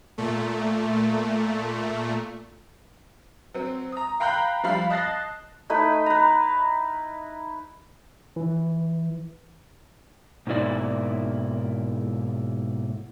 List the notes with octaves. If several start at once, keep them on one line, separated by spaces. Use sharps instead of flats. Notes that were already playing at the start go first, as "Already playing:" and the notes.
A#2 A3
F#3 C4
A#5 D#6
F5 G5 A#5 B5 F#6 G6
F3 G3 F5 B5
D#5 A5 F#6 A6 A#6 C7
A3 D#4 E4 B4
B4 A#5
E3
G#2 B2 A#3 E4 D5